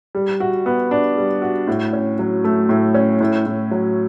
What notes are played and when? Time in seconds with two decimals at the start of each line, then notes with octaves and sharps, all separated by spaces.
0.15 G3
0.40 F#4
0.66 B3
0.91 D4
1.17 G3
1.42 F#4
1.67 A2
1.93 C#4
2.19 F#3
2.44 A3
2.69 A2
2.94 C#4
3.20 A2
3.46 A2
3.71 F#3